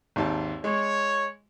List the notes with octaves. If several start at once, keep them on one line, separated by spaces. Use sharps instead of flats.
G#1 D#2 A5
G#3 C#5